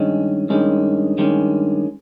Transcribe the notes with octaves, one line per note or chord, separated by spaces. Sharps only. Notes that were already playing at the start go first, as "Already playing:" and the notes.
Already playing: G2 D#3 G#3 C#4
G2 D#3 G#3 C#4
G2 D#3 G#3 C#4